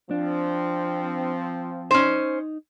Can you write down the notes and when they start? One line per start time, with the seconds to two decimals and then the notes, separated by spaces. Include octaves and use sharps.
0.11 F3 C4 D4
1.91 C#4 D#4 C5